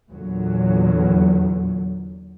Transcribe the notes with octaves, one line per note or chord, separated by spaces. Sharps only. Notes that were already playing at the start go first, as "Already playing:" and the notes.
E2 A#2 D3 F#3